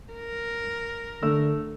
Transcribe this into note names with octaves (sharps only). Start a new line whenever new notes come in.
A#4
D3 A3 E6